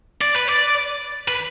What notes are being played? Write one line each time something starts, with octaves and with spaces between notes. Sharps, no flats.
D5
B4
D5
B4